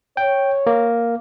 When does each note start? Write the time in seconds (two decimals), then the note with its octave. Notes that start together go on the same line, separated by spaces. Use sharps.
0.17 C#5 G5
0.67 A#3